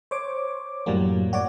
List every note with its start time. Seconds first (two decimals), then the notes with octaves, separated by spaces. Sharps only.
0.11 C5 C#5 D6
0.86 F#2 A2 F#3 G3 A#3
1.33 F#4 C#5 D5 D6